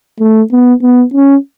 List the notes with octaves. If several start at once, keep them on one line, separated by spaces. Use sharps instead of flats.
A3
B3
B3
C#4